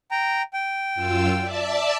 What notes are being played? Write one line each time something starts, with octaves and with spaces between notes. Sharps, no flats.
G5 A#5
G5
F#2 F4 E6
D5 E5 A5